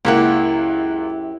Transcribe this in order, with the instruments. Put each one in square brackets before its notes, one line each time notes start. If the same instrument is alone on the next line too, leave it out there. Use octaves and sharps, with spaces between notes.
[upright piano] C#2 A#3 F#5 [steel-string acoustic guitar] F#2 E4 G4